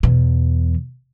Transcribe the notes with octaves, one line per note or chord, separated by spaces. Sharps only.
E2 B2